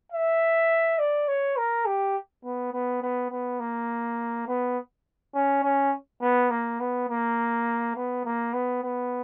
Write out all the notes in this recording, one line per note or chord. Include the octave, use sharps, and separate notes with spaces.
E5
D5
C#5
A#4
G4
B3
B3
B3
B3
A#3
B3
C#4
C#4
B3
A#3
B3
A#3
B3
A#3
B3
B3